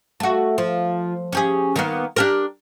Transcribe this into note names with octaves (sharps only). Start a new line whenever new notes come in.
A3 F#4
F3
C#4 G4 G#4
D#3 A#3 B3
D4 G4 A#4